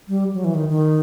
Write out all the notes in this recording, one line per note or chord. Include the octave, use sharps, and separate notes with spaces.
G3
F#3
E3
D#3
D#3